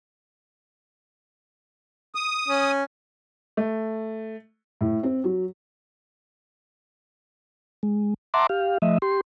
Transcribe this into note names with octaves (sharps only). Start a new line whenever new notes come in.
D#6
C#4
A3
A2
C4
F#3
G#3
E5 F#5 A5 A#5 C6 D6
G4 F5
F3 A3 D#5 E5
G4 C6